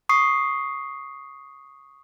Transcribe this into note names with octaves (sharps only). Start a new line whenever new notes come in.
C#6 D#6 C7